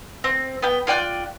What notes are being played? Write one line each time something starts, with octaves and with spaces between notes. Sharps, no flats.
C4
B3 G5
F4 D5 G5 F#6